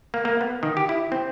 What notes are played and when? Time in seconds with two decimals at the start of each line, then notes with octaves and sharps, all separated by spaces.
0.14 A#3
0.25 A#3
0.41 B3
0.63 D#3
0.77 G4
0.89 E4
1.12 C4